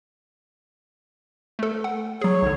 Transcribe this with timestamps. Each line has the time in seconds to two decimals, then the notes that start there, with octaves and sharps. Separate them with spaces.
1.59 A3 A4
1.84 F#5
2.21 F#3 G#4 C#5
2.42 B1 D3